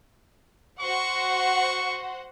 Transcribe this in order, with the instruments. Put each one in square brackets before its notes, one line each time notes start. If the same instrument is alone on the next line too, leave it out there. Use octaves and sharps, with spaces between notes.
[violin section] F#4 C5 F#5 [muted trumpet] C#6